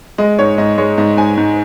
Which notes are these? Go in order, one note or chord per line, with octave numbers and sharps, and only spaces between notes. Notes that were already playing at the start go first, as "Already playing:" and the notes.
G#3 D#5
G#2 C#5
G#2 D#5
G#3 C#5
G#2 D#5
G#2 G#5
G#2